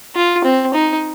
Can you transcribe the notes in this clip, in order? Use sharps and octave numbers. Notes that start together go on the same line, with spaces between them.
F4
C4
D#4